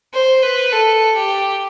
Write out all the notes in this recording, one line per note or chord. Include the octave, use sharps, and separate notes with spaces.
C5
B4
A4
G4